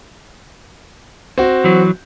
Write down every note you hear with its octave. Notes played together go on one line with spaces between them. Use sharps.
C4 F#4
E3 F#3